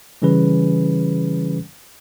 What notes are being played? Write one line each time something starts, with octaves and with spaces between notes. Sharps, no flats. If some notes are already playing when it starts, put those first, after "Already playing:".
C#3 E3 G3 C#4 G#4 B4